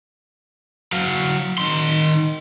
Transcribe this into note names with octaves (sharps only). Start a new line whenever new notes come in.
F#3 F5
D#3 C6